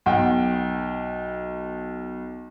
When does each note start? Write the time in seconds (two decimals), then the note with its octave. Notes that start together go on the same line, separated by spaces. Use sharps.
0.06 B1 G5